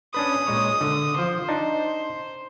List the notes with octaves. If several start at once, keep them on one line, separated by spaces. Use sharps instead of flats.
C#4 D4 B4 D#6
A#2 G#3 C#5
D3
F3 C5
D4 D#4